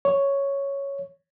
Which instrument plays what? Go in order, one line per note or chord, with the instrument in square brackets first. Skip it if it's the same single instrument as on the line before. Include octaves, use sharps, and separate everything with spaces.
[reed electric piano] C#5